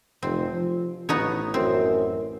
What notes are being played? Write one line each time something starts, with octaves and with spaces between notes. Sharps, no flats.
F1 C4
F3
A1 B3 D#4 C#5
F#2 C4